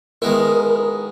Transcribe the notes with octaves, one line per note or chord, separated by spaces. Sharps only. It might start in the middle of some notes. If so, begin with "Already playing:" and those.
D#3 G#3 B3 E4 A#4